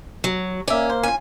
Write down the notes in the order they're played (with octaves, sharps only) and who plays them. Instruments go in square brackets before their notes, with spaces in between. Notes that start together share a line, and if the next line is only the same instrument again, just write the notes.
[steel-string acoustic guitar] F#3
[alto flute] A#3 [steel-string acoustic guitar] C#4 [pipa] D5 E5
[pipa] C5
[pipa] C#4 F4 [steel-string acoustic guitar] G#5